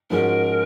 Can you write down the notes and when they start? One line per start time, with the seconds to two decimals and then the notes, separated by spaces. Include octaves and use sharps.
0.10 G#2 F3 G#3 C#4 F#4 A#4